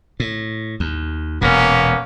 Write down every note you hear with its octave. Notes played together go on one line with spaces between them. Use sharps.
A2
D#2
E1 A#2 A#3 B3 C#4